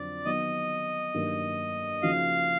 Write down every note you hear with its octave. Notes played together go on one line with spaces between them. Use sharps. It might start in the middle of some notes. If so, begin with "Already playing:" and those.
Already playing: F2 D3 F#3 D5
D#3 F#3 B3 D#5
G2 D#3 F#3 A#3
C#3 F3 A#3 D#4 F#4 F5